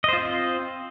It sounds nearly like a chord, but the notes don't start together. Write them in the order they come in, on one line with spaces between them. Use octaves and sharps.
D#5 C5 F4 C4